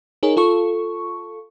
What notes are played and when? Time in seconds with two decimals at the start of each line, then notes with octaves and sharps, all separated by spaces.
0.23 D#4 G#4 A#4 C#5
0.37 F4 A4 C#6